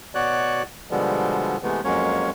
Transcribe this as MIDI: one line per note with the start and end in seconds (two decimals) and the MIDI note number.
0.15 0.62 47
0.15 0.62 66
0.15 0.62 73
0.15 0.62 74
0.15 0.62 90
0.91 1.57 47
0.91 1.57 50
0.91 1.57 53
0.91 1.57 55
0.91 1.57 56
0.91 1.57 59
1.63 1.81 48
1.63 1.81 52
1.63 1.81 56
1.63 1.81 57
1.63 1.81 59
1.84 2.30 41
1.84 2.30 54
1.84 2.30 56
1.84 2.30 58
1.84 2.30 61
1.84 2.30 73